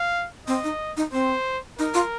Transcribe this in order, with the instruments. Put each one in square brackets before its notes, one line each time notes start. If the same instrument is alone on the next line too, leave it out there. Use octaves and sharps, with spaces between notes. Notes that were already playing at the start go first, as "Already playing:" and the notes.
Already playing: [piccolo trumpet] F5
[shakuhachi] C4 [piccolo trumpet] D#5
[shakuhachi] D#4
D#4
[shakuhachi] C4 [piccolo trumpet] C5
[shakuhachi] D#4 [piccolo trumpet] A#4
[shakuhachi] F4